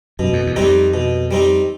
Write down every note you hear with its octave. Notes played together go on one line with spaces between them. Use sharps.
F#2 B2
F2
E2
F2 G3 C4 D#4
B2
G3 C4 D#4